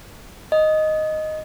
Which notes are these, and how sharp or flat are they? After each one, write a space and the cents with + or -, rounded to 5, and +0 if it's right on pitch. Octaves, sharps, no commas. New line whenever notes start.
D#5 +0